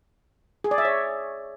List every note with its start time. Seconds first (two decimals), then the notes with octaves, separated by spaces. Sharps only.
0.64 G#4
0.71 D5
0.78 E5
0.85 C#5